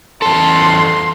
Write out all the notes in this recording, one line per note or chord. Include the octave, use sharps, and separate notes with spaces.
E2 A4 C6